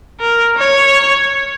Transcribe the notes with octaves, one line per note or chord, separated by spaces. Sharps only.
A#4
C#5